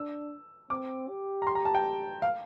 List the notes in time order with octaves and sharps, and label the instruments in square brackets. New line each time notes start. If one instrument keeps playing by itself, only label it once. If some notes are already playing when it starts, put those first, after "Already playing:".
Already playing: [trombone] D4 [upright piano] E6
[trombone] C4 [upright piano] D6
[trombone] G4
[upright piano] A#5
C6
A#5
A5
G5
F5